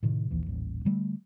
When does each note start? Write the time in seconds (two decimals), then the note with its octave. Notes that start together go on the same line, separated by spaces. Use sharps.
0.03 A2 C3 D#3
0.31 A#1 D#2 E3
0.46 D#1 A1
0.85 D3 G3 A3